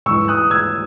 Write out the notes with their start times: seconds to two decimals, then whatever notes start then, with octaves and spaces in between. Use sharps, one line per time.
0.06 G#2 E3 C#6 E6
0.28 D#6 F#6
0.50 E6 G#6